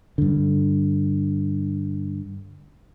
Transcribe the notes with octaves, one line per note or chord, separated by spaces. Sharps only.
G2 D3